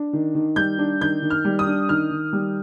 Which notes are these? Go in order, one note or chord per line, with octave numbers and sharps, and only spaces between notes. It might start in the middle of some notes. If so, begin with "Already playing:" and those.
Already playing: D4
D#3
D#3
G3 G6
D4
D#3 G6
D#3
F6
G3
D#6
D4
D#3 F6
D#3
G3